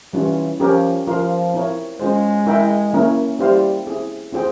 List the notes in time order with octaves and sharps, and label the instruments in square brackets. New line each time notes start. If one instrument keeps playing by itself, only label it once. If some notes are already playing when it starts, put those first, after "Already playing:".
[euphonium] E3 [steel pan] G3 C#4 F4
[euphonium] F3 [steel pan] C#4 G4 A#4
[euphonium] F3 [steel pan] F4 A#4 F5
[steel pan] C4 E4 A#4 C#5
[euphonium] G#3 [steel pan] C#4 F4 C5
[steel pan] E4 A#4 E5 G5
A#3 C#4 E4 A#4
[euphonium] G3 [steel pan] E4 G4 C5 F5
[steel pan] C4 E4 G#4
C4 F4 G#4 C5 G5